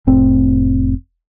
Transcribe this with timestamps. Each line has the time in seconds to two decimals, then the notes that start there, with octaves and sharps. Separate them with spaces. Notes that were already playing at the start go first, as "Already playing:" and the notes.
0.07 F1 A2 C4